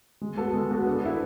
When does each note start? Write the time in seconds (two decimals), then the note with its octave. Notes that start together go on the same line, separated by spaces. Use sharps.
0.21 G#3
0.37 B3 F#4 A4
0.54 G#3
0.71 B3 F#4 A4
0.87 D3
1.03 A3 E4 B4